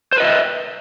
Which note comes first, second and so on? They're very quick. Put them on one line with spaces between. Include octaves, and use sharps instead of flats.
C5 B4 D#5 E5